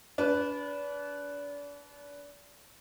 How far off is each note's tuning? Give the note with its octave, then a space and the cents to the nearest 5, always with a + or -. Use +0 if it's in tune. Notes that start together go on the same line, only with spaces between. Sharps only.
D4 -35 B4 +0